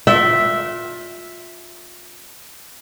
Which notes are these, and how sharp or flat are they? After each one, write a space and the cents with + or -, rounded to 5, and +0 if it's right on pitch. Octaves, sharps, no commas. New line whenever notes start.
F4 +20 E5 +0 G5 -35